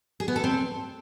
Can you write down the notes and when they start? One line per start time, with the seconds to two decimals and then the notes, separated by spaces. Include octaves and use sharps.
0.20 G#4
0.28 B3
0.36 A4
0.44 C4